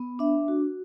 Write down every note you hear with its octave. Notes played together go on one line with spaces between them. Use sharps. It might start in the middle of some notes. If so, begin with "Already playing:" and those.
Already playing: B3
D4 E5
F#4